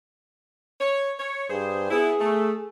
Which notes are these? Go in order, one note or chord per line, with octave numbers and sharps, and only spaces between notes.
C#5
C#5
G2 G#4 C5
B3 E4 G#4
A3